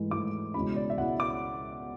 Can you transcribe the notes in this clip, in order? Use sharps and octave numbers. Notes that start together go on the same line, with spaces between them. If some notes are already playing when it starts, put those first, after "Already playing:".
Already playing: G#2 E3 A3 E4
G#2 E3 A3 E4 D6
C#2 B2 G#3 C#4 E4 B5
D5
E5
C#2 B2 G#3 C#4 E4 F#5
D6